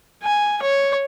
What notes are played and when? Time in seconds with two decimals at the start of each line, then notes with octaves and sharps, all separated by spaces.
0.23 G#5
0.62 C#5